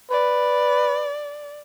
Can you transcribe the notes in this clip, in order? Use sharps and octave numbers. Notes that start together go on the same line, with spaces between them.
B4 D5